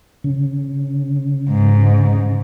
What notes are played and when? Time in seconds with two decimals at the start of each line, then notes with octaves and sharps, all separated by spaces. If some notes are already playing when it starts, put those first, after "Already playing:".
0.24 C#3
1.49 G#2